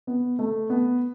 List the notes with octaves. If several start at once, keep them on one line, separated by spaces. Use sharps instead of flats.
B3
A3
B3